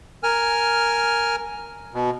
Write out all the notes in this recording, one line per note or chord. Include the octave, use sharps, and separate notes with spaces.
A#4 G#5 F6
B2